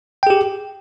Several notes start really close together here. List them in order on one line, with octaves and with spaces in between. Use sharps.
G5 G#4 G4